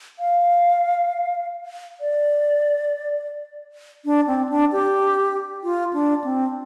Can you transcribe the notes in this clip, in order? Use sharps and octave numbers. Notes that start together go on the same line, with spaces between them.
F5
D5
D4
C4
D4
G4
F4
D4
C4